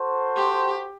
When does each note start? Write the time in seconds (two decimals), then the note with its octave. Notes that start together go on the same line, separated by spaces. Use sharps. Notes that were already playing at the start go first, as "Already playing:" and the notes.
Already playing: F#4 A4 C5
0.36 G4